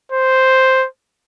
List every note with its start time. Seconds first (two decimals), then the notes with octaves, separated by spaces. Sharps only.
0.12 C5